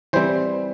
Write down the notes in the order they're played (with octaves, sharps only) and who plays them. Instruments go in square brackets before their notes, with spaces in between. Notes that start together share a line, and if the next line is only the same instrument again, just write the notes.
[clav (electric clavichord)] E3 G3 C4 C5